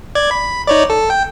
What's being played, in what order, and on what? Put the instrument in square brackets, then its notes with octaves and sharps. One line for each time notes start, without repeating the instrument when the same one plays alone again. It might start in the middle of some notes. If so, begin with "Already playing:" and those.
[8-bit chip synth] D5 G#6
B5
D#4 C#5 D5
A4
G5